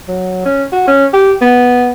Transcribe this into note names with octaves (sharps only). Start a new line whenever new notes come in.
F#3
C#4
F#4
C#4
G4
B3